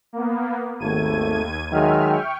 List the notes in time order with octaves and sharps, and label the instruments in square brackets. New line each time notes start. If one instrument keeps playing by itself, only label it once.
[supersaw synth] A#3 B3
[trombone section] G#1 A3 [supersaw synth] D#2 G#6 D#7
[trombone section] D#3 F#3 G#3 [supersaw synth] E5 F6
[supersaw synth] G5 C#6